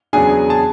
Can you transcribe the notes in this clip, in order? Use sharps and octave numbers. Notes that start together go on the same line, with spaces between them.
E2 C#3 F#3 B3 D4 G#4 G#5
A5